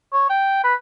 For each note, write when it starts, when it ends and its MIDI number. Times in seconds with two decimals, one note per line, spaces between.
0.13 0.28 73
0.30 0.61 79
0.64 0.74 71